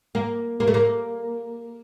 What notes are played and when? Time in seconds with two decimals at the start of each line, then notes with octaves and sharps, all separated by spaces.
0.15 A#3
0.60 A#3
0.68 A3
0.74 A#3